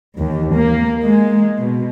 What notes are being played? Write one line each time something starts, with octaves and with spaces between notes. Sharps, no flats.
D#2
A#3
G#3
B2